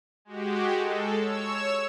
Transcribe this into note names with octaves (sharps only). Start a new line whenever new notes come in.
G#3 F#4 G4
G#3 A4
C#5 E6